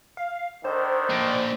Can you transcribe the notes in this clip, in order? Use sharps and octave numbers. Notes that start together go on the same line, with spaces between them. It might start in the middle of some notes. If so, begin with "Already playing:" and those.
F5
D3 D#3 C5
A#3 D4